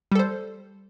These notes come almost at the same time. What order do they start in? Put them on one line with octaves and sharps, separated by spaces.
G3 A4 C5